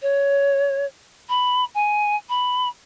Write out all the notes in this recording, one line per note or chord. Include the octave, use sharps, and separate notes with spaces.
C#5
B5
G#5
B5